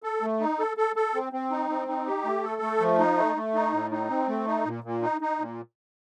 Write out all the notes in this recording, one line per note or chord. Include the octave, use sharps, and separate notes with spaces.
A4
A3
D#4
A4
A4
A4
C4
C4
D#4
C4
D#4
G4
A3
A4
A3
F3
D#4
A3
A3
D#4
A2
D#4
C4
A3
D#4
A#2
A#2
D#4
D#4
A#2